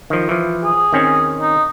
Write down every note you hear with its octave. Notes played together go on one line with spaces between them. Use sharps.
D#3 F3
E3 F3
G#4
D#3 C4 C#4
D#4